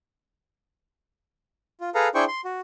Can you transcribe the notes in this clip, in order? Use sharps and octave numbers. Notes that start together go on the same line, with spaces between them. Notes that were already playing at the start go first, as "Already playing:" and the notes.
F4
G#4 A4 B4 F5 A#5
D4 E4 G#4 C5 G5 C#6
C6
F#4